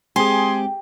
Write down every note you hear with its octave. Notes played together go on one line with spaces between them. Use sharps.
G#3 C4 G4 G#4 G#5 C6